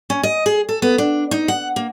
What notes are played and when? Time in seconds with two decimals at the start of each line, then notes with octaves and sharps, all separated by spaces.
0.10 C#4
0.23 D#5
0.46 G#4
0.69 A4
0.82 B3
0.98 D4
1.31 D#4
1.48 F#5
1.76 A#3